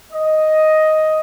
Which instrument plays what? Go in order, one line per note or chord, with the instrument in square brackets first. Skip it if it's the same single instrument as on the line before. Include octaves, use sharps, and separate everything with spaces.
[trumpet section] D#5